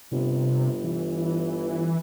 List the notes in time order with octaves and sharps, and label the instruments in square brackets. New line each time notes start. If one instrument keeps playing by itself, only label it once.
[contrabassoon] G1 [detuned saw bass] C3
[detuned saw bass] E3